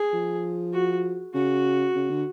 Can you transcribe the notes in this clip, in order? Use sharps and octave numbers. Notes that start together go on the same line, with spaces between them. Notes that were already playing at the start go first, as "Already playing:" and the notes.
Already playing: G#4
F3
F#4
C#3 F#4
C#3
D3